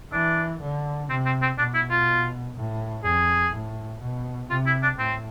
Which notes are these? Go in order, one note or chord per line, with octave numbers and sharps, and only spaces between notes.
E3 D4
D3
C3 C4
C4
C4
B2 D4
E4
F4
A2
F2 G#4
A2
B2
C3 F4
E4
D4
A2 C4